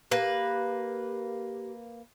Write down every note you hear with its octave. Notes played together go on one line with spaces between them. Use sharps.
A#3 G4 B4